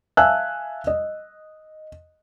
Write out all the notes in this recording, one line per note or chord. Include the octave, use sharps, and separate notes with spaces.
E5 F5 G#5 A5 E6 F#6
D#5